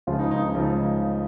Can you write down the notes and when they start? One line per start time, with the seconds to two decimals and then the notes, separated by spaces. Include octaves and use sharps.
0.07 C#2 C#3 F3 F4
0.19 D#4
0.31 D#4
0.43 D#4
0.55 C#2 C#3 F3